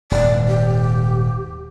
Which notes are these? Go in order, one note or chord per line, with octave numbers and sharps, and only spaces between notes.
D#1 G#2 D5
G4